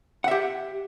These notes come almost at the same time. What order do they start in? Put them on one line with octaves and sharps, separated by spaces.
F#5 E5 G4